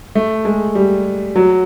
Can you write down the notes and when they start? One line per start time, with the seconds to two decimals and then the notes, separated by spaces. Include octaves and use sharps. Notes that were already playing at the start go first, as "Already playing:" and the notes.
0.15 A3
0.45 G#3
0.75 G3
1.36 F#3